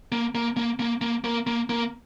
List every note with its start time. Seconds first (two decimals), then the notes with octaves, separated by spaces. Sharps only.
0.12 A#3
0.35 A#3
0.57 A#3
0.79 A#3
1.01 A#3
1.24 A#3
1.47 A#3
1.69 A#3